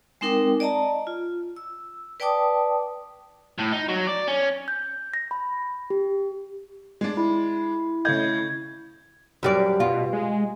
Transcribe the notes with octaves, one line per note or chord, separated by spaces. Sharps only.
G#3 C4 D#4 A#4 G5 D6
D5 D#5 A5 A#5
F4
E6
B4 D5 G5 A5 D6 D#6
A2
D#4
F#3
D5
C#4
G6
A#6
B5
G4
G#3 D4
E4
C#3 A3 D#5 G6 G#6
F#2 G3 D5
B2 F4
G#3